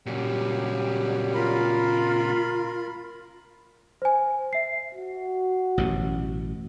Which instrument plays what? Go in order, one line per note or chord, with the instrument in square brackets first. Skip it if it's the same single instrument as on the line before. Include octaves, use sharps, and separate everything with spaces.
[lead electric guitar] A#2 C#3 [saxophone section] F#3 G3 G4
[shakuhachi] F4 [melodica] A#4 B5
[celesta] C5 G#5
E5 C7
[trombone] F#4
[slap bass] A1 F#2 B2